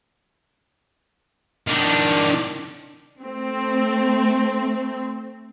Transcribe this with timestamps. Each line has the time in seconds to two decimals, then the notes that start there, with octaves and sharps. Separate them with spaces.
1.67 D#3 D4
3.21 A3 C4